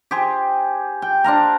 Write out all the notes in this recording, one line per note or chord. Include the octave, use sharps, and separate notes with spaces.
G4 G#4 C5
G5
D4 C5 F5 A#5